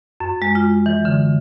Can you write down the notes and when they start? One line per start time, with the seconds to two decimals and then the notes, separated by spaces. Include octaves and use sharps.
0.20 F#2
0.42 G#3
0.55 F4
0.86 E3
1.05 D3